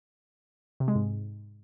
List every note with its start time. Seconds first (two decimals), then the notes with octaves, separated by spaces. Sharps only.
0.80 C3
0.88 G#3
0.95 G#2